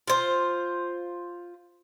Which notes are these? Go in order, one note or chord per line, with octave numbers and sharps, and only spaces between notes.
F4 C5